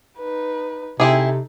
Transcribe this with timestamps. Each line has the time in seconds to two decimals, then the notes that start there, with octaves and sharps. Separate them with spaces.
0.18 D#4 B4
1.00 C3 C4 D#4 E4 G#4 A4